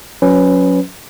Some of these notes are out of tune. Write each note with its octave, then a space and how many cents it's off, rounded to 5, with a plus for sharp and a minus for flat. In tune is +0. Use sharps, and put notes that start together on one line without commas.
F#3 -25 C#4 +0 B4 +10